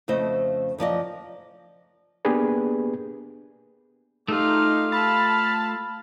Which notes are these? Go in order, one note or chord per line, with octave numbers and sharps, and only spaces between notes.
F2 C#3 A3 C5 D#5
F#2 F3 D5 D#5
A#3 B3 D4 G4 G#4 B4
A3 D#4 F4 G4 F5
F5 A5 B5